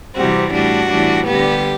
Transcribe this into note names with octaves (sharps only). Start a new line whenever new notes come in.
C3 E3 G3 C4 F#4
A2 G3 D4 F#4
A2 E3 G3 D4
D3 G3 B3 G4